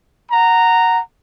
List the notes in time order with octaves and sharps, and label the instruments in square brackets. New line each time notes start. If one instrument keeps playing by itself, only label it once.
[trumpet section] F#5 A#5